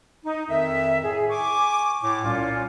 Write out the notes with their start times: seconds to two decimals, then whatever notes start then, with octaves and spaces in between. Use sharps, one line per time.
0.24 D#4
0.49 F2 D#3 E5
1.03 A2 G#4
1.29 G#5 C#6 D6
2.02 A2 D6
2.24 C2 A#2 C#4 F4